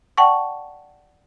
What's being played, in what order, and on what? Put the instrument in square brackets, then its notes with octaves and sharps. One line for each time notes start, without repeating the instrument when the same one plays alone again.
[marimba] D5 F#5 G5 A5 C#6